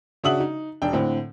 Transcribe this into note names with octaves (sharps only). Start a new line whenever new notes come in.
C#3 D4 F#4 E5 D#6 F#7
D#4
E1 D4 G5
A2 D3 C4